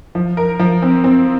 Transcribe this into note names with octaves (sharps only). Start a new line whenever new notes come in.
F3
A#4
F3
C4
C4